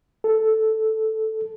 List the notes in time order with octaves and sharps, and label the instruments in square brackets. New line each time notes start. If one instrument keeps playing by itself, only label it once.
[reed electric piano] A4